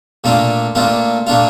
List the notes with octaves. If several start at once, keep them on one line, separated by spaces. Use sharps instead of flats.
A#2 A3 D4 F4
A#2 A3 D4 F4
A#2 A3 D4 F4